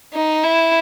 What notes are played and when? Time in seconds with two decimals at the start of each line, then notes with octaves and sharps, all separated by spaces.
0.14 D#4
0.44 E4